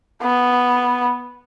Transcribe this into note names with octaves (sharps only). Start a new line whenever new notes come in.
B3